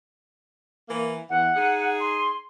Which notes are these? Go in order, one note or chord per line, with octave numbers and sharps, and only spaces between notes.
E3 A#3
E2 E3 F#5
D#4 G#4
C6